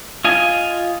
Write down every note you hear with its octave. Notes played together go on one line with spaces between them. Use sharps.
F4 D#5 G#5